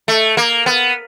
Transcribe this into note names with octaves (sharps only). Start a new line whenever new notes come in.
A3
A#3
B3